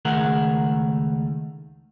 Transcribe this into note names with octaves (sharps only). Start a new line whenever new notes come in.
C#2 D#3 A3 G#4 A#4 F#5